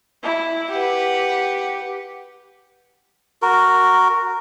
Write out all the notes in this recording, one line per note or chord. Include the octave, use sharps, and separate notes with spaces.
E4
G4 B4 F#5
F#4 A#4